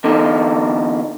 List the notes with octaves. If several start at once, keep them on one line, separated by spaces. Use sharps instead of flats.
E2 D3 D#4